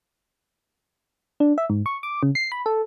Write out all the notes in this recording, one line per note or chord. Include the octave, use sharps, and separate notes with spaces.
D4
E5
G#2
C#6
D6
C#3
C7
B5
A4